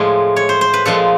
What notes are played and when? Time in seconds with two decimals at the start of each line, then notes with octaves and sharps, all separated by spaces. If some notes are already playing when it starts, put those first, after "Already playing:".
Already playing: A2 F3 G#3
0.36 C#5
0.49 C5
0.61 C5
0.74 B4
0.86 A#2 F3 G#3 A4